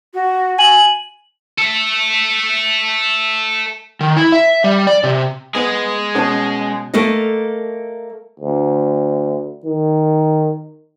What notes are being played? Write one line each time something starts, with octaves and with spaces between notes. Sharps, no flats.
F#4
G#5 F#7
A4 E5
D#3
E4
E5
G3
D5
C3
G#3 B3 G#4 D#6
B2 C#4 A5
A3 A#3 A4 A#4 D#5
D2
D#3